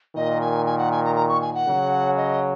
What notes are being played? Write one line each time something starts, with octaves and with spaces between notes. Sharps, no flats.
A#2 D#3 D#5
G#5
G#5
F#5
G#5
A#5
A#5
C#6
G#5
F#5
C#3 F#3
D#5